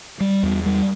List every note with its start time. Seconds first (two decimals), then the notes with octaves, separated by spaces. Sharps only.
0.20 G3
0.43 E2
0.66 G3